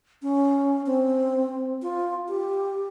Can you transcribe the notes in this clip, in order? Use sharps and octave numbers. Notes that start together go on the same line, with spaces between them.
C#4
C4
F4
G4